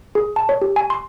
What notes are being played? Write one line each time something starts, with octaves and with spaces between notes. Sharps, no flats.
G#4
A5
C#5
G4
G#5
C6